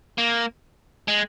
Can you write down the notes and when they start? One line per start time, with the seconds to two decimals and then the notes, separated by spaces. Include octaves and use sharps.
0.18 A#3
1.08 G#3